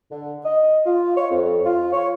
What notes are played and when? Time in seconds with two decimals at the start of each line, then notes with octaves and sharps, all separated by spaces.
0.11 D3
0.43 D#5
0.85 F4
1.17 C#5
1.30 F2
1.65 F4
1.92 C#5